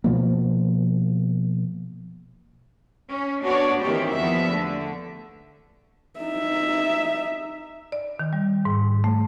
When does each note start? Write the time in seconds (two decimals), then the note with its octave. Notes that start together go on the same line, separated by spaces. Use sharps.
0.04 B2 F3 A#3
3.09 C#4
3.44 B3 D4 F#4 C#5 D5
3.80 D#3 E3 A#3 C4 F#4 G4
4.13 E2 F3 B3 E5
4.48 D3 A3
6.19 D#4 E5
7.92 D5
8.19 D#3
8.33 G3
8.65 G#2
9.04 A3